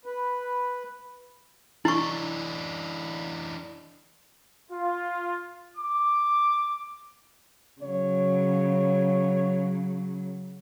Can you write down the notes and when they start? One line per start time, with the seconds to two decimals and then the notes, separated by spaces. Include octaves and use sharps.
0.05 B4
1.85 E3 D4 E4 C#6
4.71 F4
5.77 D6
7.82 C#3 F#3 C#5